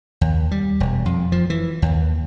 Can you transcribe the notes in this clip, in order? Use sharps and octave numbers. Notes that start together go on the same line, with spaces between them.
D#2
G3
E1
F2
F3
E3
D#2